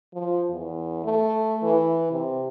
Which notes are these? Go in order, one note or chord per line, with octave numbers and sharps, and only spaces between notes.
F3
E2
A3
E3
C3